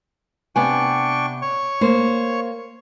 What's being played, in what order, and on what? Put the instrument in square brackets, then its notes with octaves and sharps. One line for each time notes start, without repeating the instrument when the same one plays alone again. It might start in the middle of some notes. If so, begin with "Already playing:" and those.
[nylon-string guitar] C3 B3 G#5 [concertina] D4 G5 C#6
[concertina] C#5 C#6
[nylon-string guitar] A#3 C5